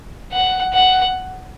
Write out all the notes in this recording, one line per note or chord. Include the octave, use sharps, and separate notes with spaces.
F#5
F#5